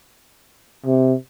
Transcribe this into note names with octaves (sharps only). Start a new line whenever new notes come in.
C3